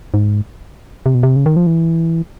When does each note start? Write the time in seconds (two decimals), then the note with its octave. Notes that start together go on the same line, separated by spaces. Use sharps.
0.14 G#2
1.06 C3
1.15 B2
1.23 C3
1.36 C#3
1.46 D#3
1.56 F3
1.67 E3